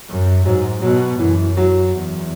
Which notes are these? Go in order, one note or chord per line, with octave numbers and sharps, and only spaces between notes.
F#2
G#2 F#3
B2 F#3
F#2 E3
F#3
E2